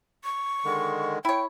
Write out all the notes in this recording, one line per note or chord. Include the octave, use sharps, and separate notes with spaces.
C#6
D3 D#3 G#3
E4 C#5 G5